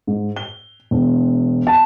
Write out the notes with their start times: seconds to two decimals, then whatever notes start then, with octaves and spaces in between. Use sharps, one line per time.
0.07 G#2
0.36 G7
0.91 E1
1.67 A5